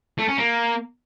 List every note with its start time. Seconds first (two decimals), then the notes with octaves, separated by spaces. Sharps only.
0.18 A3
0.28 C#4
0.38 A#3